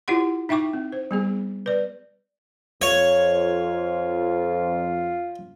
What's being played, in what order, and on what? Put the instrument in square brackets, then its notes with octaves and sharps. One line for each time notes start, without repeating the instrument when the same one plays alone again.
[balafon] E4 F4 G4 F#5 C6
D#4 E5 G5 C#6 D6
C4
C5
G3 B3 G#4
B4 D5
[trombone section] F2 [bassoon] F4 [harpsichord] C#5